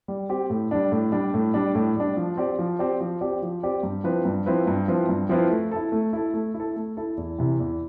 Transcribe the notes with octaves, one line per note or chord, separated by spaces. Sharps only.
G3
C4 G4
A2
G3 D4
A2
G3 D4
A2
G3 D4
A2
G3 D4
F3
C4 G4 D5
F3
C4 G4 D5
F3
C4 G4 D5
F3
C4 G4 D5
G2
F3 C4 E4 B4
G2
F3 C4 E4 B4
G2
F3 C4 E4 B4
G2
F3 C4 E4 B4
A3
E4 A4
A3
E4 A4
A3
E4
A4
A3
E4 A4
E2
C3 E3
E2